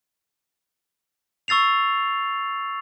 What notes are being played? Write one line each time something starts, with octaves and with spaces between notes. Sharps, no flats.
C#6 E6 A6 C7 F7